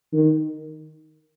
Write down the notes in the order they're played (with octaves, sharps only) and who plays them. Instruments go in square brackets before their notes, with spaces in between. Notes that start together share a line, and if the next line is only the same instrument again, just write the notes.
[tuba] D#3